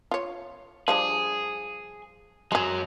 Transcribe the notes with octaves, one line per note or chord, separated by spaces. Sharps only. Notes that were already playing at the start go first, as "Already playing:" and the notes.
F4 C#5
F3 G3 D4 G#4
F#2 F#3 G#3 G#4